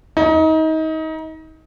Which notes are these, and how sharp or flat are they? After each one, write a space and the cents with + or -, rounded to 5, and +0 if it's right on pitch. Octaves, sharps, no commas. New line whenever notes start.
D#4 +30